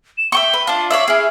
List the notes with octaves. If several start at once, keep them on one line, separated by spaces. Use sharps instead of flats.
E7
E5 G5 C#6 G7
B4
D4 F4 A5
C#5 D5 E5 F5
E4 G#4 F6